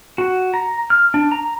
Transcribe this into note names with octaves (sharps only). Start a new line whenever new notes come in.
F#4
A#5
F6
D4
A#5